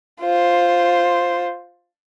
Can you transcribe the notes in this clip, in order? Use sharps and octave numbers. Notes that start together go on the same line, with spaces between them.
F4 C5